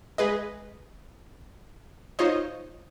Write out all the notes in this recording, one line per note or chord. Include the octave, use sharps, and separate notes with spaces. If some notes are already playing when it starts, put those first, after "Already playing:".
G#3 G#4 B4 D#5
D#4 F4 C5 C#5 D#5